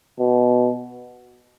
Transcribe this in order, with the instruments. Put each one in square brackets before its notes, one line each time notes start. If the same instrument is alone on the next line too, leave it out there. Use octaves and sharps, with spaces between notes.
[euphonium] B2